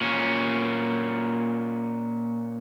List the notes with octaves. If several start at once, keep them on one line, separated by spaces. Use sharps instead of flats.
A#2 C#4